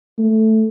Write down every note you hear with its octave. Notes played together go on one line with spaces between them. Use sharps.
A3